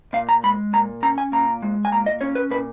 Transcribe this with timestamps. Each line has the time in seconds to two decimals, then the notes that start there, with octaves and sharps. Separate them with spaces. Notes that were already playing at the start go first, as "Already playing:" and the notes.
0.13 A#2 F5
0.29 A#5
0.43 G#3 B5
0.73 A#2 A#5
1.03 C#4 A#5
1.18 G#5
1.32 A#2 A#5
1.62 G#3
1.85 G#5
1.92 A#2 A#5
2.06 D#5
2.21 C#4 C#5
2.35 B4
2.50 A#2 B4